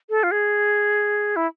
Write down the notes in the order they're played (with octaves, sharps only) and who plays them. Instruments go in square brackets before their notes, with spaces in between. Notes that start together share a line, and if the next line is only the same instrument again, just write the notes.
[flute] A4
F4
G#4
E4